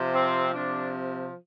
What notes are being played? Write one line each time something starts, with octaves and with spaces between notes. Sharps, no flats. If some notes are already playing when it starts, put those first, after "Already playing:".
Already playing: C3 F3
C4
C3 F3 D4